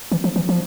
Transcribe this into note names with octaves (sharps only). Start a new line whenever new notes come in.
E3
F3
E3
F3